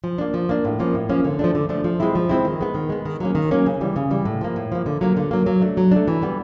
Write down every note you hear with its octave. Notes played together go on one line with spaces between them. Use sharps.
F3
A#3 D4
F3
A#3 D4
A2
F3 A#3 C#4
A2
F3 A#3 C#4
D3
F3 A3 D4
D3
F3 A3 D4
F3
G#3 C4 E4
F3
G#3 C4 E4
D#3
G#3 B3
D#3
G#3 B3
D#3
F#3 A#3 C#4
D#3
F#3 A#3 C#4
C#3
E3 G3
C#3
E3 G3
A2
F3 A#3
A2
F3 A#3
D3
F#3 A#3
D3
F#3 A#3
F#3
A3 D4
F#3
A3 D4
E3
G3 B3